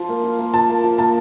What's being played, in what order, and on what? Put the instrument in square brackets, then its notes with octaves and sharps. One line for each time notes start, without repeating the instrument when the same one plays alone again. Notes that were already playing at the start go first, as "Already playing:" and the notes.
Already playing: [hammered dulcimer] F3
A#3
F4
A#3
[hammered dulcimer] F3 [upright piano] A5
[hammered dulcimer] A#3
F3
[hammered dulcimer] A#3 [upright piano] A5